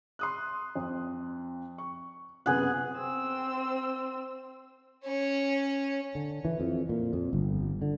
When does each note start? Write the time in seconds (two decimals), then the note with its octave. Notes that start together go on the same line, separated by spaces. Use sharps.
0.19 C6 D#6 F#6
0.75 F2
1.78 C#6
2.46 F#2 C3 B3 G#4 F#5
2.97 C4 E6
5.05 C#4 C#5
6.15 D3
6.45 E3
6.60 F2
6.89 A#2
7.13 F2
7.33 G1
7.82 D3